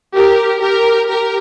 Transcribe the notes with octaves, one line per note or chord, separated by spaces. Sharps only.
G4 A#4
G4 A#4
G4 A#4